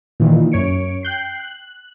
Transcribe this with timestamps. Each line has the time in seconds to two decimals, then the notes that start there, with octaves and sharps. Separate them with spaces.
0.20 A#2 D#3 E3
0.52 F#2 C#5 C#7 D7
1.03 G5 F#6 G6 C7
1.40 F#6